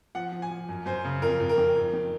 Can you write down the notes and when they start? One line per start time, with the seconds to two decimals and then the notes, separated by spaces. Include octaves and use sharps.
0.15 F3 F#5
0.32 F3
0.42 G#5
0.51 F3
0.69 F#2
0.86 F#2 C5
1.04 C#3
1.22 F2 A#4
1.40 F2
1.49 A#4
1.58 D#3
1.76 F2
1.93 D#3